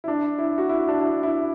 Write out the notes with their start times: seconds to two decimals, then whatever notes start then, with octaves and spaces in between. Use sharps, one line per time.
0.04 E4
0.08 D4
0.38 E4
0.58 F#4
0.69 E4
0.88 D4
1.00 E4
1.23 E4